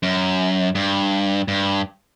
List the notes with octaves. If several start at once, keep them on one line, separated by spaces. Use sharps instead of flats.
F#2
G2
G2